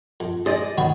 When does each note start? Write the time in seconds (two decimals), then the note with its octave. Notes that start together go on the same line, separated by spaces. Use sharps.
0.20 F2
0.46 G#4 C5 D5 D#5
0.78 D#3 B3 F#4 C#5